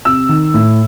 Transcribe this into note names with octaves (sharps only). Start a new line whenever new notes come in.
C3 E6
D#3
A2